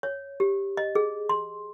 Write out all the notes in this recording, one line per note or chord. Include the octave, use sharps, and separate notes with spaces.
C#5
G4
D#5
G#4
C6